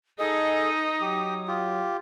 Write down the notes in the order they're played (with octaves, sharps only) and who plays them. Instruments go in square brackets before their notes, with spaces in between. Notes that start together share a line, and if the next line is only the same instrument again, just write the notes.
[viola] D#4 [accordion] G#4 A4 D#5 [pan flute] D#6
[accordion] F#3 [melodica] G4
[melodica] F4 G4